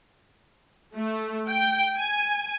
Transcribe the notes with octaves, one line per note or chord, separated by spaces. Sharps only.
A3
G5
G#5